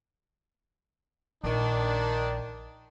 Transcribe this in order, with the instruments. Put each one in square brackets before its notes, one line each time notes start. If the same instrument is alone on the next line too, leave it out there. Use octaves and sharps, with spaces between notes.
[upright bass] A#1 [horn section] D#3 D4